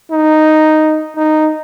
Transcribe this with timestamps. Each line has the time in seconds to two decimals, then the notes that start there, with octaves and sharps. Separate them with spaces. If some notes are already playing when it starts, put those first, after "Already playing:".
0.11 D#4
1.16 D#4